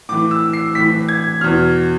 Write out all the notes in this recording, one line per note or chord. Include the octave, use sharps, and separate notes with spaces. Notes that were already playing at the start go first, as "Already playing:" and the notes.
A2 E3 D6
E6
C7
A2 E3 B6
G#6
E2 B2 F6